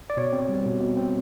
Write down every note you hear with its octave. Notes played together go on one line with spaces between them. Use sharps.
D5
B2 C#5
C4
G3
B2
B2
C4